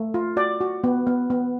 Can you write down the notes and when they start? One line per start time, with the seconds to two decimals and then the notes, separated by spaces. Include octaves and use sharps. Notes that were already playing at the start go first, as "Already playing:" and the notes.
Already playing: A3
0.14 F4
0.37 F#4 D5
0.61 F#4
0.84 B3
1.07 B3
1.30 B3